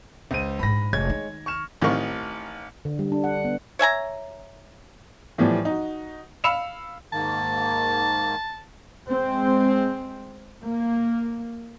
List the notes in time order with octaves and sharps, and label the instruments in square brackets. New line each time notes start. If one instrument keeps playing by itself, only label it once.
[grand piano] C#2 C5 D#7
[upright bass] A#1 G#2 [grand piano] B5 A#6
[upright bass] F1 [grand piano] G#3 C#5 G#6
[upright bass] D#3
[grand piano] C#6 F6 E7
[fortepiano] A1 D#3 C4 D#4 A#4 C#6
[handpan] D3
G3
D4
F#5
B3
[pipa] C#5 E5 G#5 A#5
[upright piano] A2 E3 F3 G3
D#4 F#4
F5 B5 E6 C#7 E7 F7
[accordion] G#2 D#3 A#3 [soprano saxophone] A5
[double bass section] G#3 C4
A#3